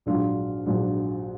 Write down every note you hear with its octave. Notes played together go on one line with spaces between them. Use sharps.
A#1 G#2 F#3 D4 F4
A#1 G#2 F#3 D4 F4